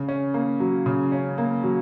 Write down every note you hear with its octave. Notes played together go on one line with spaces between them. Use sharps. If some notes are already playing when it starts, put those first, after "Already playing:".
Already playing: C#3
C#4
A#3
F#3
C#3
C#4
A#3
F#3